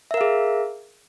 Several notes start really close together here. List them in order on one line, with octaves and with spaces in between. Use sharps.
E5 A#4 F5 G#4